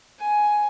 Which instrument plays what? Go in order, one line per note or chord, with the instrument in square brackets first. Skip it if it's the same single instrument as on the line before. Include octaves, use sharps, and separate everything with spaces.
[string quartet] G#5